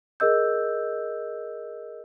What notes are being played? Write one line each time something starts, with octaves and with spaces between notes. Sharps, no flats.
G#4 A#4 D#5 E6 G6